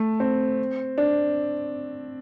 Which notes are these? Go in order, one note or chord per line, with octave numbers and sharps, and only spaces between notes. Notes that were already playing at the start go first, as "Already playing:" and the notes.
Already playing: A3
C4
D4